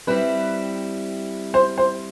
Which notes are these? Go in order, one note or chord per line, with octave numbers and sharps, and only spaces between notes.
G3 C4 E4 B4
C5
C5